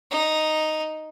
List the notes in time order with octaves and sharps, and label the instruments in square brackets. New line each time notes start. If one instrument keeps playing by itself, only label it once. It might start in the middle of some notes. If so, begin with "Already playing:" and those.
[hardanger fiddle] D#4